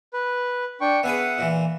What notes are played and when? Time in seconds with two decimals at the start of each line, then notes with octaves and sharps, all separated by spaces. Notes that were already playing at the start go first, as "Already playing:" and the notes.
0.13 B4
0.81 D4 G5 C#6
1.03 B3 G#4 B4 E5 F#5
1.38 A#2 E3